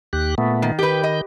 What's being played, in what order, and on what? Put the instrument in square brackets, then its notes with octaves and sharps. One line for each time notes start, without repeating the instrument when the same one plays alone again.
[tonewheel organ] D#2 G4 F#6
A#2 A3 B3
[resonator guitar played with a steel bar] D#3
[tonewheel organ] D#3 G6 [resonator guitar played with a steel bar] G4 B4
[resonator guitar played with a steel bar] D#5